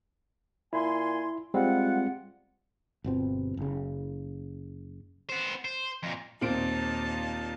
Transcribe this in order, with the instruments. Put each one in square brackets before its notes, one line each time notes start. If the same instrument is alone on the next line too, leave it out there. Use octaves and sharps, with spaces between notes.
[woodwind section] A#2 G#5 C6 [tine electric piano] E4
[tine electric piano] G3 G#3 C4 [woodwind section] F4 F#5
[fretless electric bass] G1 B2 C4
F#1 C#3
[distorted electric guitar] B3 C5
C5
F2 A#2
[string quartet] D#2 D#4 A5 [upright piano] A#2 C4 D7